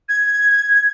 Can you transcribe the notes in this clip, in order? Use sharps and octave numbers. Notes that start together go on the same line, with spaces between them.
G#6